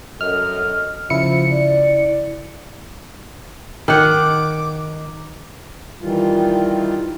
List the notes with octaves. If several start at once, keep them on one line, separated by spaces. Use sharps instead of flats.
F#2 A4 D#5 F6
C#3 F3 E4 C#7
D5
D#3 F#5 D6
D#3 E3 G3 F4